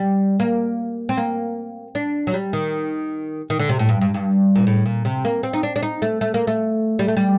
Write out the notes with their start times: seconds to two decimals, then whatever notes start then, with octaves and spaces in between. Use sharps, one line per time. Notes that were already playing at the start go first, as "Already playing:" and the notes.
Already playing: G3
0.40 A#3
1.09 C4
1.17 A#3
1.95 D4
2.27 F#3
2.34 G3
2.53 D#3
3.50 D#3
3.59 D3
3.69 C3
3.79 A2
3.89 G2
4.01 G2
4.14 G2
4.56 A#2
4.67 A2
4.86 A#2
5.05 C3
5.25 A#3
5.43 C4
5.53 D#4
5.63 D4
5.76 D4
5.83 D#4
6.02 A3
6.21 A3
6.34 A#3
6.47 A3
6.99 G3
7.08 A3
7.17 G3